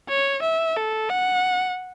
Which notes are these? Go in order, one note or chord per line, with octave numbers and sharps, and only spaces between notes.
C#5
E5
A4
F#5